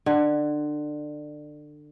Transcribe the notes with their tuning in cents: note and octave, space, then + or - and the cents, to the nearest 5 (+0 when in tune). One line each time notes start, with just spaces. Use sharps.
D3 +25